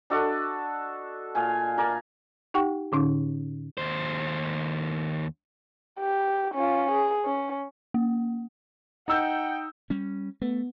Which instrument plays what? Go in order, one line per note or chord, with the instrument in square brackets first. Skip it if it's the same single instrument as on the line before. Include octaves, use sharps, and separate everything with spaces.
[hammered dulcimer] D4 F#4 A4 D#5
A#2 F5 G#5
A#4 D5 G#5
[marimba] D#4 G4 F#5 G5 C#6
A2 D3 C#4 D#4
[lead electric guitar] D#2 C5
[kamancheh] G4
C#4 F4
G#4
C#4
[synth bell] A#3
[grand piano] D#4 E6 G6 [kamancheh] F#5 G5
[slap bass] G3 C#4
[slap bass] A3 [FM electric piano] B3